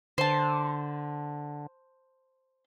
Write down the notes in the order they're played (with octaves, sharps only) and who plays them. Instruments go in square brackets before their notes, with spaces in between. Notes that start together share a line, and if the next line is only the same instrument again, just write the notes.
[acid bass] D3 [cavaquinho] C5 A5